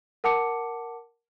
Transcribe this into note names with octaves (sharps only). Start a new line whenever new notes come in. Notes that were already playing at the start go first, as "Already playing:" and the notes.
A#4 F#5 A5 D6 C#7